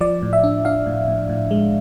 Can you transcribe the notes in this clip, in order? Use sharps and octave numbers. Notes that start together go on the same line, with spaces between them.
F3 D5
A2
E5
D4
D4 F5
A2
A2
A2
G#3